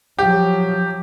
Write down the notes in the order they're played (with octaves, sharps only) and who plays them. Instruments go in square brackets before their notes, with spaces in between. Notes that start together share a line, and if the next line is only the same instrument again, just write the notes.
[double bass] F3 F#3 [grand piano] G4